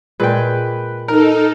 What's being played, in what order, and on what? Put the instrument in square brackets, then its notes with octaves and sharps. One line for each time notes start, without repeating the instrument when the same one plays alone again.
[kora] A#2 G#3 [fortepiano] B4 G5
[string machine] D#4 A4 [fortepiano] A#4